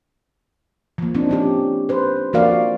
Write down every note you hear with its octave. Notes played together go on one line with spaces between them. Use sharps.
F3 A#3
C4 D4 D#4
F3 C#4 G4
B4 C5
F3 A#3 F#4 A#4 D5 F5